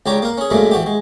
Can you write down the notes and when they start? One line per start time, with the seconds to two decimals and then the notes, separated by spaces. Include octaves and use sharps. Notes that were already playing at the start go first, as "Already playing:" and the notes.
0.06 C#2 D4 G4 C#5 A#5
0.22 A#3 A#4
0.38 C#4 G#4
0.50 F#2 A#2 C#3 G#3 A3 D4
0.71 E3 F#4 G4
0.86 G#3